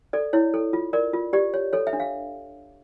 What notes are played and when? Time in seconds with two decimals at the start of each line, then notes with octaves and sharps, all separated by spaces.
0.13 A4 D5
0.33 E4 C#5
0.54 A4
0.73 F4
0.93 A#4 D5
1.13 F4
1.33 G4 D5
1.54 C#5
1.73 A4 C#5
1.87 E5
1.93 D4
2.00 F5